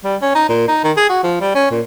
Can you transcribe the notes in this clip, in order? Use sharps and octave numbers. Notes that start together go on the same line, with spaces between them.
G3
C#4
D#4
A#2
D#4
D#3
G#4
F#4
F3
G3
C#4
A#2